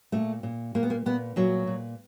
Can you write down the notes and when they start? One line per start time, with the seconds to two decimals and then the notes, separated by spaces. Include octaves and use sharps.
0.12 A#2 A3
0.43 A#2
0.75 A#2 A#3
0.83 B3
0.90 A#3
1.06 A#2 B3
1.36 A#2 F#3
1.67 A#2